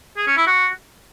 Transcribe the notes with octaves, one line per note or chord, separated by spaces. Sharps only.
G#4
C#4
E4
F#4